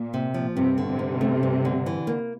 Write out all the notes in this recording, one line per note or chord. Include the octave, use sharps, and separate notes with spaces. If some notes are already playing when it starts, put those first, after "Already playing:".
Already playing: A#2
C3
F3
G2 C3
D3
C3
G2
A3
G2
D3
E3
A#3